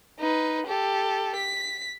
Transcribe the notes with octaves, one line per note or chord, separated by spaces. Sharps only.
D#4 B4
G4 A4
B6